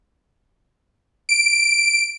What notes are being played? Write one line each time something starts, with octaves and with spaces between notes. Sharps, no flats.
D7